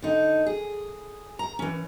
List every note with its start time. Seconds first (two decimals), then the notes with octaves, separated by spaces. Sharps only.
0.02 D3 D#4
0.46 G#4
1.39 A#5
1.59 E3 C#4